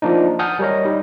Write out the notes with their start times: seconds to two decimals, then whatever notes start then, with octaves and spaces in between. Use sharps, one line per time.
0.02 F3 A#3 D4 D#4
0.39 F#5 G#5 A5 D#6 F6 G6
0.59 G3 A#4 C#5 D#5
0.85 G3 D#4